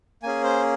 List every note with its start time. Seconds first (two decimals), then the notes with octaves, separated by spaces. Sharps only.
0.23 A#3 C#4 G#4 G#5
0.44 C5